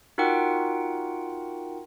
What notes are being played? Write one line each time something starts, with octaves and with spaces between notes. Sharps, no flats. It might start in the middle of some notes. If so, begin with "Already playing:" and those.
D#4 F4 F#4 A#4 F#5 G5